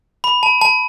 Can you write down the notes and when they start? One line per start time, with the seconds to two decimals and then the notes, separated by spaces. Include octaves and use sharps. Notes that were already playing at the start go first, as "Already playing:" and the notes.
0.24 B5
0.43 A5
0.61 A5